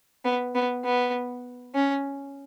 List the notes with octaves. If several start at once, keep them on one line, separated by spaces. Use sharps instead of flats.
B3
B3
B3
C#4